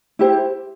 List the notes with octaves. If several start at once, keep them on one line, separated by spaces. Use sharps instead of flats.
E4 G4 C5